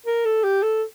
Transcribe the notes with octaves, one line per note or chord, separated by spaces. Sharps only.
A#4
A4
G4
A4